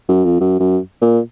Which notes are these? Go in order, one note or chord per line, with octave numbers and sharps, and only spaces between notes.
F#2
F2
F#2
F#2
A#2